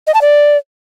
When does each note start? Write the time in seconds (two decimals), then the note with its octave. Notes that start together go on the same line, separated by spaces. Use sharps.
0.07 D#5
0.14 A5
0.21 D5